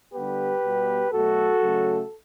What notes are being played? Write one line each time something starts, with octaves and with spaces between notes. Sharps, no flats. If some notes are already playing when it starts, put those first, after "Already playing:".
D3 G3 B3 G4 B4
B2 G3 B3
B2 F#3 A3 F#4 A4
C#3 F#3 A3